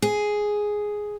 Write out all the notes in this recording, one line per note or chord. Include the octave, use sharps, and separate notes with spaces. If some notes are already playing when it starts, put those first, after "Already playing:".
G#4